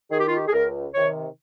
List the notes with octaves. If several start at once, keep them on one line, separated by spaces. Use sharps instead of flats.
D#3 G#4
G4
F4
G4
G#4
C#2 A#4
C3 D#3 C#5